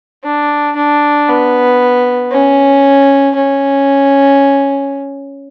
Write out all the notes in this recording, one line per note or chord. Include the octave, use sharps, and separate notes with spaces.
D4
D4
B3
C#4
C#4